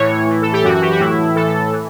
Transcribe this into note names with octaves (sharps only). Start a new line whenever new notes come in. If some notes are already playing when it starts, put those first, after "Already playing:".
Already playing: A2 E3 C#5
A2 E3
A4
G4
F#2 E3 F#4
G4
F#4
A2 E3 E4
A2 E3 A4
E3